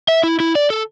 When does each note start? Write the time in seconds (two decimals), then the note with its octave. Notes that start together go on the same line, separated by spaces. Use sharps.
0.08 E5
0.23 E4
0.40 E4
0.55 D5
0.70 A4